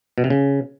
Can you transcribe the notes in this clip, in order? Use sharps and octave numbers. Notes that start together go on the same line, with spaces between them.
B2
C3
C#3